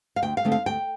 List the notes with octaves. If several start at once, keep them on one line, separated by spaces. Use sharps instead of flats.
F5
D2 G5
F5
D3 A3 C4 D#4
F5
D2 G5